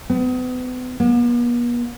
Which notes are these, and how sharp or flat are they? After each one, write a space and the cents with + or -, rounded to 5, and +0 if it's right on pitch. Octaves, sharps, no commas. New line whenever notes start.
B3 +35
B3 -45